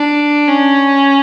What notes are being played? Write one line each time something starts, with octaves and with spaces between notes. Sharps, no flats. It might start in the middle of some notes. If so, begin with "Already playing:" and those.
Already playing: D4
C#4